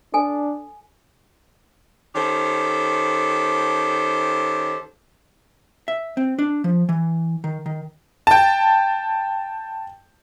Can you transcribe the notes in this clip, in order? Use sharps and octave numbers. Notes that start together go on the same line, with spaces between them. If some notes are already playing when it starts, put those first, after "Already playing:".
D4 A4 G#5
D#3 C#4 G4 A4 C5
E5
C4
D4
F3
E3
D#3
D#3
G5 A5